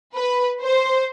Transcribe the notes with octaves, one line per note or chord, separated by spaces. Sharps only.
B4
C5